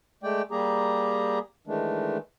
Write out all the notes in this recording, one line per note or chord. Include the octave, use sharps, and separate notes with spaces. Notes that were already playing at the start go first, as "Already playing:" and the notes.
G#3 A3 D5 G5
G3 A#3 G4 G#4 A#5
D#3 E3 G#3 A3 D4